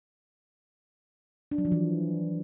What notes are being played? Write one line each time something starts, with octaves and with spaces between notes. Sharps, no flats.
D4
F#3
F3
E3